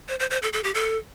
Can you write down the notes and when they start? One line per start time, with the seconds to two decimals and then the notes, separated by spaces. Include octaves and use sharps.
0.09 C5
0.19 C5
0.30 C5
0.42 A4
0.53 A4
0.64 G4
0.74 A4